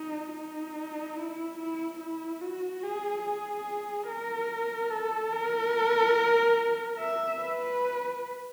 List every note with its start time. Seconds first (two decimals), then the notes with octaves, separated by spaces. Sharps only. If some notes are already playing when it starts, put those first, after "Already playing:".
Already playing: D#4
0.33 D#4
1.16 E4
1.58 E4
2.00 E4
2.41 F#4
2.83 G#4
3.24 G#4
4.08 A#4
4.90 A4
5.32 A#4
6.99 E5
7.40 B4